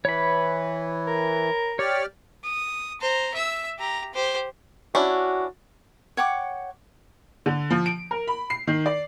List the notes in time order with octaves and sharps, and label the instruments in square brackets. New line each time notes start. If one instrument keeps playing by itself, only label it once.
[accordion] E3 [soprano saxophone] B4 [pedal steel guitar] C#5 B5
[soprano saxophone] A#4
[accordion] G4 D5 F6 [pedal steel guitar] C#5
[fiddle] D#6
C5 A#5
E5 E6
G4 A#5
G4 C5
[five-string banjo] C#4 D4 E4 [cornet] F#4
[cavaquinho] C#5 F#5 G5 D6
[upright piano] D3
F3
D7
A#4
B5
C7
D#3
D5